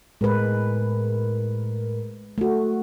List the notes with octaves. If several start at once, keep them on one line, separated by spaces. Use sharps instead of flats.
A2 G#3 A#4 B4
A3 F#4